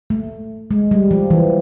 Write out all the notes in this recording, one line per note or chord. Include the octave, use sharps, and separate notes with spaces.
A3
G#3
G3
F3
E3